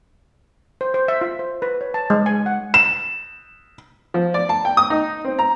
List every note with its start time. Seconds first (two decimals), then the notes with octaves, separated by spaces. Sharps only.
0.81 C5
0.94 C5
1.08 E5
1.21 F4
1.39 C5
1.62 B4
1.81 C#5
1.94 A5
2.10 G#3
2.26 G#5
2.46 F#5
2.74 E7
4.14 F3
4.34 D5
4.49 A5
4.65 G5
4.77 D#6
4.90 D#4
5.25 C4
5.39 A#5